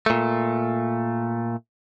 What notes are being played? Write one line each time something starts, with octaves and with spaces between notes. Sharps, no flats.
A#2 A3